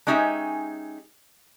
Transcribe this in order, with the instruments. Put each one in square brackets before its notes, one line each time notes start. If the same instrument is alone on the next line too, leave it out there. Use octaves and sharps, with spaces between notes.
[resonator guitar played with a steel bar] G#3 C#4 D#4 G4 E5 G#5